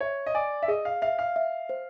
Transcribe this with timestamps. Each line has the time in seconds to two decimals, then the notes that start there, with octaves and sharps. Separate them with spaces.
0.01 C#5 E5
0.26 D#5
0.35 D5 G#5
0.63 E5
0.68 G#4 D#5
0.85 F5
1.02 E5 F5
1.19 F5
1.36 E5
1.69 C5